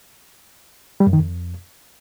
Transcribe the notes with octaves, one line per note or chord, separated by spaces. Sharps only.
G3
F#2
D#3
F2